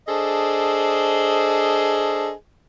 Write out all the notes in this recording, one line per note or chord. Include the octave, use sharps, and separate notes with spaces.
D4 G#4 A4 C5 D#5